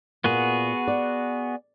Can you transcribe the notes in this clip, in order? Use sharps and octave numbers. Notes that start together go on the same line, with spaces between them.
A#2 B3 F#4 G#4
D5